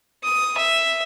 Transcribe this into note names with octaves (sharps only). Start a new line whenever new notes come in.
D#6
E5